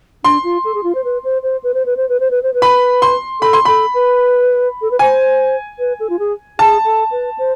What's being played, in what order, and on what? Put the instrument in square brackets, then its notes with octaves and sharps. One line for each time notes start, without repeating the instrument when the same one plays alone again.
[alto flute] D4 [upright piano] C6
[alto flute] F4
A4
G#4
F4
C5
B4
C5
C5
B4
C5
B4
C5
B4
C5
B4
C5
B4
[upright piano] B5
C6
[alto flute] A4 [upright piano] B5
[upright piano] C6
[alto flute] A4 [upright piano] B5
[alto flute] B4
A4
B4
[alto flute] C5 [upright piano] G#5
[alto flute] B4
A4
F4
G#4
[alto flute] G#4 [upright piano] A5
[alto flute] A4
B4
C5